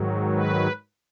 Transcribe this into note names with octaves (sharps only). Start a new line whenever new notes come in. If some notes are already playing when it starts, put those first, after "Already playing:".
Already playing: G#2 D#3 F#3
B4